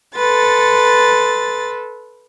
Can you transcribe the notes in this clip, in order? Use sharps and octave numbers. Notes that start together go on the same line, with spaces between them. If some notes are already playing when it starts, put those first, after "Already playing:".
A4 B4 C6 A6